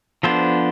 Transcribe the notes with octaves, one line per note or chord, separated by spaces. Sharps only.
F3 B3 D4 A4 C5